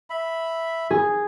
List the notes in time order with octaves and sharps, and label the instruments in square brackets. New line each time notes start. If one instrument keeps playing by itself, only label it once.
[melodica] E5 B5
[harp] G#4